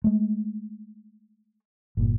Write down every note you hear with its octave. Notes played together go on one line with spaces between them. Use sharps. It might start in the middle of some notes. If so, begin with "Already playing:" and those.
G#3 A3
G1 A#2